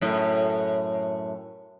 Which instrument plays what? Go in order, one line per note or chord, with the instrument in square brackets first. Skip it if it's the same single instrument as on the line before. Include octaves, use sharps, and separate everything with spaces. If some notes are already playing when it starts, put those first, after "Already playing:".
[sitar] F#2 A2